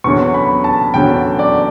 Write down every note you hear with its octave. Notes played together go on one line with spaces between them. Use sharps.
E2 D3 F#3 C#4 C#6
B5
A5
E2 D3 F#3 C#4 G5
D5